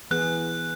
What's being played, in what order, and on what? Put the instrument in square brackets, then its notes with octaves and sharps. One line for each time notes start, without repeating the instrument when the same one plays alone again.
[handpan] E3 B3 G#4 [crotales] F#6